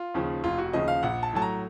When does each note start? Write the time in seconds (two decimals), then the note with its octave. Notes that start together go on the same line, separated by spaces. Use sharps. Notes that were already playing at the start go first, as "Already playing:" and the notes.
Already playing: F4
0.14 D#2 C#3 F3
0.44 F1 F4
0.58 F#4
0.73 D#2 C#3 F3 D#5
0.88 F5
1.03 A#1 F#5
1.23 A5
1.33 A2 F#3 A5
1.42 A#5